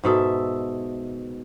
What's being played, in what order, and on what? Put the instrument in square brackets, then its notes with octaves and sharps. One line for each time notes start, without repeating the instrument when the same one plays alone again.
[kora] G#2 B2 A4 E5